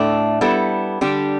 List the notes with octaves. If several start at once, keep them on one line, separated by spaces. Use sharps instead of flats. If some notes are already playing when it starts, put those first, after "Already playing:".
Already playing: A2 A3 D4
G3 B3 E4 A4
D3 G3 D4 G4